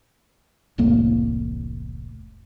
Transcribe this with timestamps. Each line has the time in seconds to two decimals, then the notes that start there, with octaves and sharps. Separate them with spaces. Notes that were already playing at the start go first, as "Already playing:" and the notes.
0.78 E1 C2 A2 A#3